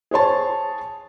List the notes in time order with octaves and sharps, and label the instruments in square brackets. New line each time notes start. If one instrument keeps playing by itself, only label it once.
[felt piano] G#4 C5 C#5 A5